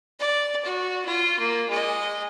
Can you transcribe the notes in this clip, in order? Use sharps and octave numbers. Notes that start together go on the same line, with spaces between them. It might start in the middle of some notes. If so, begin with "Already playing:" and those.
D5
F#4
F4
A#3
G#3 D#5